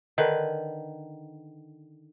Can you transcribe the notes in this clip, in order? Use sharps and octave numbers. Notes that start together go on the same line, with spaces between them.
D3 D#3 B4